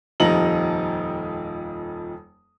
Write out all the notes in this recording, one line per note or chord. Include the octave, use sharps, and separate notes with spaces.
D#1 F2 F3 D#4 A#5 F#7